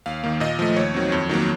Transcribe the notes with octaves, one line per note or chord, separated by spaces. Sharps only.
D#2 F5
D#3 A#3
A#2 D#5
F3 A3
D#2 C#5
D#3 F#3 C4
F2
D#3 F#3 A#3